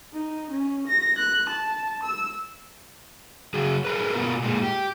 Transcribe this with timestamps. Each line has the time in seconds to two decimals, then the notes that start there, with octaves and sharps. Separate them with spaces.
0.14 D#4
0.51 C#4
0.88 A#6
1.18 F#6
1.50 A5
2.03 E6
3.54 C#3 F#3 G#4
3.85 G#4 A#4 B4
4.13 B2 B3 F4 A#4
4.43 A#2 G#3
4.63 G4